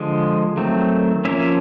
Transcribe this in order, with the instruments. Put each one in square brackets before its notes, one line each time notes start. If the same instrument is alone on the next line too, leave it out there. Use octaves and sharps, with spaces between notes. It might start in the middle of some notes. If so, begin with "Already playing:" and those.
Already playing: [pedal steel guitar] D3 F3 G#3
D#3 F#3 A3 C4
F3 A#3 C#4 E5